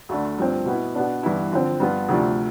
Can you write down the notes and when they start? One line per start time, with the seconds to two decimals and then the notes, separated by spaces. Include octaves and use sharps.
0.09 D2 D3 A3 D4
0.38 G2 F3 C4
0.66 B2 B3 E4
0.95 B2 B3 D4
1.23 G2 E3 B3 E4
1.52 D3 F3 C4
1.80 G2 F3 B3 F4
2.09 D2 C3 F3 A3 D4